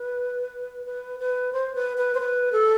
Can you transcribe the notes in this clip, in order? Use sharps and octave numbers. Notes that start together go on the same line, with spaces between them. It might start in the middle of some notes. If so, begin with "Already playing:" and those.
Already playing: B4
B4
B4
C5
B4
B4
C5
B4
A4